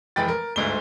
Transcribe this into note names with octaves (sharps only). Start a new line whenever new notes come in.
F1 E3 G#3 G5 B5 A6
A#4
G1 D2 G#2 A3 G7